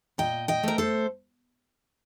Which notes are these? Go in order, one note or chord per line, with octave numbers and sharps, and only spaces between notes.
A#2 D#5 G5
D#5 G5
A3 A#4
A4 C5